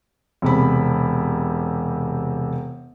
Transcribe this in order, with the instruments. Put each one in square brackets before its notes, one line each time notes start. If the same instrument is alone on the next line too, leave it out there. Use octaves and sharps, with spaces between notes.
[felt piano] E1 C3 B5